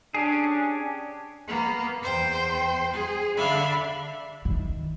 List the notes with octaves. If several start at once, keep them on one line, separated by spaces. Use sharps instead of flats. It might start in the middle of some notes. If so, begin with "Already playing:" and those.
C#4 D4 G4 G#4
A#3 B3
E2 C5 G5
G#4
D3 D4 E5 F5 B5
D#3